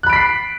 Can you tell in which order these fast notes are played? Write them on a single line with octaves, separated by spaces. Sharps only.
F#6 B5 D7 B6 C7